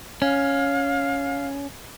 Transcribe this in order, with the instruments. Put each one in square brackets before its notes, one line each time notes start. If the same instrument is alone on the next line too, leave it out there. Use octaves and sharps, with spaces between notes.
[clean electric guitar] C#4 [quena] F5